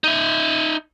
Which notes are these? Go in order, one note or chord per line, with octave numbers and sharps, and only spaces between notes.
D#4 E5